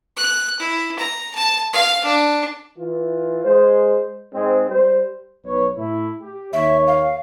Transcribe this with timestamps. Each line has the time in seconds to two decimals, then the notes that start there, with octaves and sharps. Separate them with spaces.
0.17 F#6
0.60 E4
0.99 A#5
1.35 A5
1.73 F5
2.04 D4
2.78 E3 F4
3.45 G#3 C5
4.34 G#2 G#3 C4
4.69 G3 C5
5.45 B1 B4 C#5
5.77 A2 A3 E4
6.21 G4
6.53 D#2 C#5 E5
6.87 F5